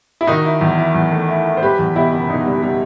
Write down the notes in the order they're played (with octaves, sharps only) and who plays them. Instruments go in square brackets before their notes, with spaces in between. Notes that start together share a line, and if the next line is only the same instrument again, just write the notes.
[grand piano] E4
[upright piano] D#3 [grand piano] D#4 F#4
[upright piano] E4
E2
E4
E2
A3
E4
E4
[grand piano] C5
[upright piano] G3 [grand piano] G4 B4
[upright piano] E2
[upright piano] B2 [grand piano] E4 G4
[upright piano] F#1
[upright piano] B2 [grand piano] D#4
[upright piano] G3
G3